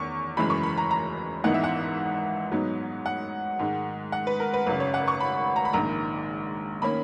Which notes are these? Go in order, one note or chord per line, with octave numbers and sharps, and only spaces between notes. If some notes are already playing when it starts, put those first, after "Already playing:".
Already playing: E2 D#3 C#4 C#6
F#1 F#2 E3 G#3 B5
C#6
B5
A#5
A#5
G#1 G#2 E3 B3 D#4 F#5
E5
F#5
G#2 F#3 B3 D#4
F#5
G#2 D#3 G#3
F#5
B4
A#4
B4
G#1 F#2 C#3 B4
C#5
F#5
C#6
B5
A#5
B5
A#1 G#2 D#3 A#5
D#3 A#3 C#4 B5